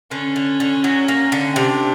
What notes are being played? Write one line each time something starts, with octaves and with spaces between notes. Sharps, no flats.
D3 C#4
D3
D3
F#3
A#3
D3
C3 D4